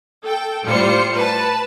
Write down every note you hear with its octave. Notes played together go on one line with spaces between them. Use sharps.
A4 G5
A2 G3 F4 C5 C#7
B4 A5